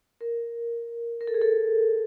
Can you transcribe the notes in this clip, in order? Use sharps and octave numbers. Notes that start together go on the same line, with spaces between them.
A#4
A#4
A4
G#4
A4